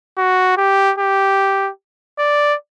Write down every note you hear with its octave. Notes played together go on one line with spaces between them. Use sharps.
F#4
G4
G4
D5